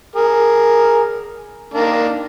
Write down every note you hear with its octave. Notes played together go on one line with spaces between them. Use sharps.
G#4 A#4
D#3 A#3 D4